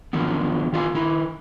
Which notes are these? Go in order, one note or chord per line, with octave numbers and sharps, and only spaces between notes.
D3 D#3 F3 F#3 B3
D#3 F4 D5 F5 G#5
D#3 E4